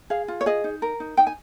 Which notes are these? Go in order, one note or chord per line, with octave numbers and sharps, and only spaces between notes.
G#4 F5
F4
C#5
G#4 D#5
D#4
A#4
D#4
D#4 G5
G#5